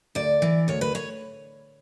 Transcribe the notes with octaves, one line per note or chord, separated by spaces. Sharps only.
D2 D5
E3
D2 C#5
B4
C#5